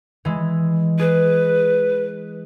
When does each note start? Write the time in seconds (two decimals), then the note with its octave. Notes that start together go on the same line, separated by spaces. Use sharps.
0.25 E3 G#3
0.99 G#4 B4